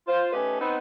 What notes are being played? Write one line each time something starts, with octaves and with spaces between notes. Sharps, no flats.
F4 C5
A3 C#4 D#4 G4 A4 B4
B3 C4 D#4